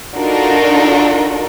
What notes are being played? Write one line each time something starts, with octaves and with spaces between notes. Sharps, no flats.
D4 D#4 F4 F#4 A4 A#4